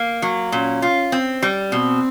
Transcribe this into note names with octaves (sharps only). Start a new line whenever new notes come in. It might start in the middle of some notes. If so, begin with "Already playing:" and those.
Already playing: A#3
F#3
A#2 C#4
F4
C4
G3
B2 C4